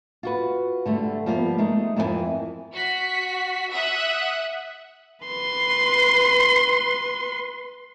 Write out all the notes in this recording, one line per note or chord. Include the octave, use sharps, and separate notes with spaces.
F4 F#4 B4
D3 G3 A3
F3 G3 A#3 B3
G#3 A3 D#4
F2 E3 E4 A4 A#4 G#5
F#4 B6
E5 F#5 D#6 F#6
B4 C6